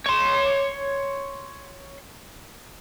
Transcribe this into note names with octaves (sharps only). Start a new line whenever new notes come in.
C#5 C6